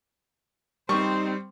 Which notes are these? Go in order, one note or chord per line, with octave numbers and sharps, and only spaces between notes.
G3 C4 D#4 C5 C#6